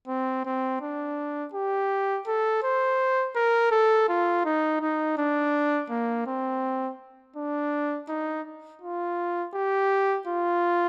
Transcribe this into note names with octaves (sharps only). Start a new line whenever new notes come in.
C4
C4
D4
G4
A4
C5
A#4
A4
F4
D#4
D#4
D4
A#3
C4
D4
D#4
F4
G4
F4